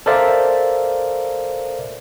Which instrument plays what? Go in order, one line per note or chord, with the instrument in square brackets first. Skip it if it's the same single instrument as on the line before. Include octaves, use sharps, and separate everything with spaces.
[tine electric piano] A4 A#4 C5 D5 E5 F5